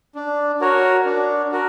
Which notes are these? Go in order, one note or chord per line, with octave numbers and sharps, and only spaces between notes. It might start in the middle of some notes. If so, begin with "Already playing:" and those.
D4
F#4 A#4 C#5
D4
F#4 A#4